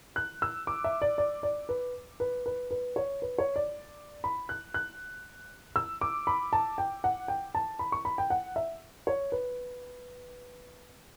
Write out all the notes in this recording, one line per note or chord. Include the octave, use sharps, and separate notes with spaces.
F#6
E6
D6
E5
D5
D5
D5
B4
B4
B4
B4
C#5
B4
C#5
D5
B5
F#6
F#6
E6
D6
B5
A5
G5
F#5
G5
A5
B5
C#6
B5
G5
F#5
E5
C#5
B4